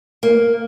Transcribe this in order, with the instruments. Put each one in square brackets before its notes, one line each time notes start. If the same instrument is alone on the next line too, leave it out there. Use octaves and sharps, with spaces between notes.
[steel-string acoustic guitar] A#3